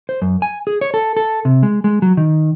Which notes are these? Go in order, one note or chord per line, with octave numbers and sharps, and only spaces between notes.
C5
F#2
G#5
G#4
C#5
A4
A4
C3
G#3
G#3
F#3
D#3